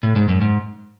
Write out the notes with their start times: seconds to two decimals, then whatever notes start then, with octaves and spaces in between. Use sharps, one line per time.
0.03 A2
0.16 G#2
0.29 F#2
0.41 G#2